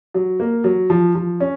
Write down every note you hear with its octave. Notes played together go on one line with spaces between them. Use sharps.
F#3
A#3
F#3
F3
F3
C#4